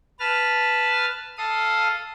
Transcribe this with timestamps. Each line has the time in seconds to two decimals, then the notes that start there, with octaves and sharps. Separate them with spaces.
0.20 B4 A5 F6
1.38 A4 F5 D#6